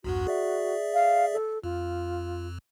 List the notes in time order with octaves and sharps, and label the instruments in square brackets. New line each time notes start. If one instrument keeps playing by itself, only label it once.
[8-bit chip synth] B1 E2 G2 [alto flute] F#4
[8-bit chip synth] G#4 D5 E5
[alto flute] F5
A4
[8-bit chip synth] F2 [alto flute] F4